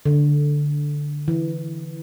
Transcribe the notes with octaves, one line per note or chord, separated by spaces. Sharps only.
D3
E3